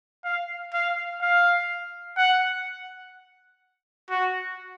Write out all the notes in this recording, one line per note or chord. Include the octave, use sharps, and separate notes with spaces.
F5
F5
F5
F#5
F#4